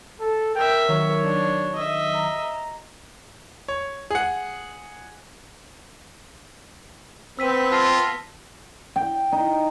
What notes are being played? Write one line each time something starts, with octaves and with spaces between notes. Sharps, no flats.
A4
A#4 E5 G5
D#3 F#3 C#5
D4
D#5 E5
A#5
C#5
G#4 F#5
B3 C4 B4 E6 B6 D#7
F4 A5 A#6 C7
G5
D#4